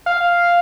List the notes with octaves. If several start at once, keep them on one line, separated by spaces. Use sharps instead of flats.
F5